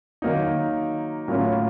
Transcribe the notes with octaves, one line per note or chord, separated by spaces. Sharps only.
D#3 F#3 A#3 D#4
A2 F#3 A#3 C#4 F4